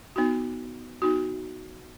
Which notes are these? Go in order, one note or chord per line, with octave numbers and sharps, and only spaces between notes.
B3 D#4 F#4
B3 D#4 F#4